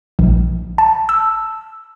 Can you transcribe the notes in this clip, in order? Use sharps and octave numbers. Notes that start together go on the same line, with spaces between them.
A#1
A5
E6